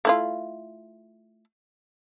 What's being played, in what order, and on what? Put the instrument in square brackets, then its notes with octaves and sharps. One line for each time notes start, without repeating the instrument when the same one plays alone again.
[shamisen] A3 E4 F4